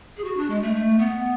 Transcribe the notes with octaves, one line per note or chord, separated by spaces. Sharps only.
G#4
F#4
D4
G#3
A3
A3
B3